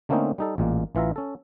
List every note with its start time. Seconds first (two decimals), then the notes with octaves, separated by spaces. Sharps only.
0.09 D3 A3 A#3 C4 C#4 D#4
0.38 G3 D#4 A4
0.58 A1 A#2 G#3 A#3
0.95 A1 E3 F4 E5 A#5
1.16 C#4 A4